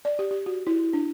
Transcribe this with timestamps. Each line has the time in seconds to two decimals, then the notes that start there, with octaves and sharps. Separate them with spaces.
0.05 D5
0.19 G4
0.31 G4
0.46 F#4
0.67 E4
0.93 D4